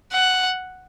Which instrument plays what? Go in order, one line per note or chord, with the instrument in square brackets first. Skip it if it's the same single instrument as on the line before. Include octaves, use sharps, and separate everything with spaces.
[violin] F#5